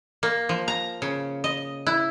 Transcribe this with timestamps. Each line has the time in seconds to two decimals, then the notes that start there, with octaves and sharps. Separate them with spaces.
0.23 A#3
0.49 F3
0.68 A#5
1.02 C#3
1.44 D#5
1.87 E4